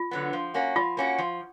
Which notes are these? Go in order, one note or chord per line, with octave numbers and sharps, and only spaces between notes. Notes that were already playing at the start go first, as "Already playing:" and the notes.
Already playing: F4
D3 F#3 B3
F3
A#3 C#4 F#4
F3 F4
A#3 C#4 F#4
F3